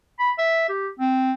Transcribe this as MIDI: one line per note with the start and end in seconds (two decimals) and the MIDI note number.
0.19 0.31 83
0.38 0.66 76
0.69 0.88 67
0.99 1.32 60